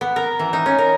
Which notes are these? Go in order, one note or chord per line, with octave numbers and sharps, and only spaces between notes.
B3
A#4
E3
D#4
C#4
A#4